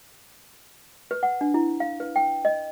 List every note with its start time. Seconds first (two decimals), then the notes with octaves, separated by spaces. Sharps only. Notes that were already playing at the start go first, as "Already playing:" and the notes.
1.11 B4
1.23 F#5
1.41 D4
1.54 E4
1.80 F5
2.00 B4
2.16 G5
2.45 D#5